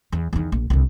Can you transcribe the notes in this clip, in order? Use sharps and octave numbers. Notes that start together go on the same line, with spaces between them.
E2
E2 D#3
A#1
C2 D3